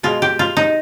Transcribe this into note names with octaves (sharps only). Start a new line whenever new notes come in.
B2 G#3 F4
G4
F4
D#4